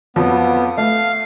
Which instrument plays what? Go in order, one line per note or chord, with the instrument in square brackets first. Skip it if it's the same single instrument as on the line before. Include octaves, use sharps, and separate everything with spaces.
[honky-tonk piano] F2 F3 F#3 [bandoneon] B3
[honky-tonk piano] A3 [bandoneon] F5